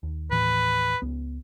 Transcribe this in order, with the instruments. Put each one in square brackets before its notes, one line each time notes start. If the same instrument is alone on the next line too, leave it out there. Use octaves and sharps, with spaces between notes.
[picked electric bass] D#2
[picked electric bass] D#2 A2 E3 [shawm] B4
[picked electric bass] C#2 B3